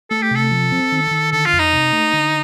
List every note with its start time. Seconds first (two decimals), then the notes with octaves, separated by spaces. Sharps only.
0.10 A3 A4
0.22 G4
0.31 C3 A4
0.51 F3
0.72 C4
0.92 D#3
1.11 D#3
1.32 D3 A4
1.46 F4
1.53 F2
1.59 D#4
1.73 C3
1.93 A3
2.13 D3